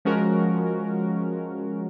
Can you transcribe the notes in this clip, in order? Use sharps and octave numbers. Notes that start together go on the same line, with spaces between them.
F3 G#3 C#4 F#4 A#4